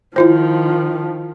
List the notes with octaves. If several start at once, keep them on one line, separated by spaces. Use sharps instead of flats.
D#3 F3 E4 F4 C5